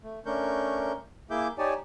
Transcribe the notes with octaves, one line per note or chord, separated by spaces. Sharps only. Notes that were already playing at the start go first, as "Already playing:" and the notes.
A3
A3 C#4 D4 A#4 C#6 G6
A#3 E4 G#4 E5 D6 G6
D#4 G4 C#5 D5 G#5 A5